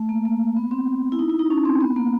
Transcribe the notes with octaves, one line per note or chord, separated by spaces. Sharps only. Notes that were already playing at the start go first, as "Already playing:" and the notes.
Already playing: A3
A#3
A#3
B3
C4
E4
D#4
E4
D#4
C#4
C4
B3
A#3